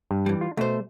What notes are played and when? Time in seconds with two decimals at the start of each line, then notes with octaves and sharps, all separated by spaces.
0.11 G2
0.26 E3 G3
0.41 F4
0.57 B2 A3 C5